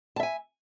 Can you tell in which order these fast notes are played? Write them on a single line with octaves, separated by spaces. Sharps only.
A5 E5 G#5